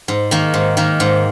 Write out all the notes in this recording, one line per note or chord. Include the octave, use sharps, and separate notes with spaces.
G#2
D#3 A#3
G#2
D#3 A#3
G#2